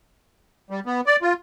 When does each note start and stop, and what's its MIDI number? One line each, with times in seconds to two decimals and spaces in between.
0.70 0.80 55
0.86 1.01 59
1.06 1.16 74
1.22 1.33 65